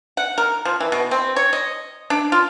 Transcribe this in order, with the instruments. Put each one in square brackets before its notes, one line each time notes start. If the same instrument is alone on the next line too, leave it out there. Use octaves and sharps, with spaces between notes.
[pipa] F#5
A#4
F3
E3
B2
C4
C#5
D#5
D4
F4